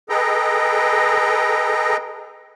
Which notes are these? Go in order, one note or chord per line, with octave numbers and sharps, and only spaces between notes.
G#4 A4 B4 D#5 G5 A#5